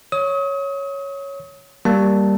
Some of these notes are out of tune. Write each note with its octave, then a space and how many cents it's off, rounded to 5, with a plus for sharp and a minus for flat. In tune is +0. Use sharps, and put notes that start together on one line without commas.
C#5 +0 D#6 +35
G3 +0 A#3 +0 A5 +0